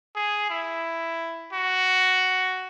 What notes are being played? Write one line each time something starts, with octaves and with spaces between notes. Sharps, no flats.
G#4
E4
F#4